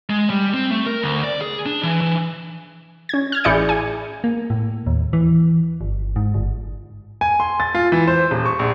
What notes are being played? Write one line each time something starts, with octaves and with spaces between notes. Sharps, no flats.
G#3
G3
C4
A3
A#4
D2
D5
G#4
D4
E3
E3
C#4 G#6
F6 G#6
A1 E4 G#4 D5 G6 C#7
G#5
A#3
A2
D#2
E3
G1
G#2
G1
G#5
C6
A6
F4
E3
C5
D#1
C#6
A#1